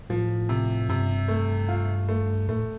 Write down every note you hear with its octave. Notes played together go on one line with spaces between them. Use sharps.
A2 F3
C3
G2 C3
A3
F4
A3
A2 A3